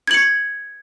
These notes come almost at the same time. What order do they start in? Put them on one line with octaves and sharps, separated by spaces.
G#6 F#7 C#7